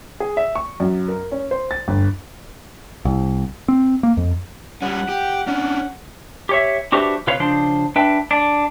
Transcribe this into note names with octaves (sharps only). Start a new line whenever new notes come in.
G#4
E5
C#6
F#2
A#4
C#4
C5
A6
G1
C2
C4
A#3
F2
G3 C#4 F#5
G4
C#4 D4 F#5
G4 C#5 E5
D4 F#4 G4 B4 C5 E5
C3 F4 B4 C#5 F5
C#3 F3 D4 C5
D4 B4 E5 G5
D4